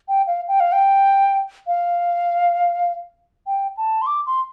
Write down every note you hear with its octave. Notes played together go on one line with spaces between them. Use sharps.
G5
F5
G5
F5
G5
F5
G5
A5
C6
D6
C6